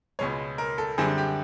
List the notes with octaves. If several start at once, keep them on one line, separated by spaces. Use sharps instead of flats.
C#2 B2 G#3 C#5
A#4
A4
F#2 D3 G3 C4 G#4
G4